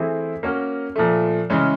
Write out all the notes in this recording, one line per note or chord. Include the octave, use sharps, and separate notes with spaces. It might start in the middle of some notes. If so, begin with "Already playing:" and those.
Already playing: E3 A3 C4 E4 G#4
A#3 C#4 F#4 A#4
A#2 F3 A3
C#3 E3 G#3 C#4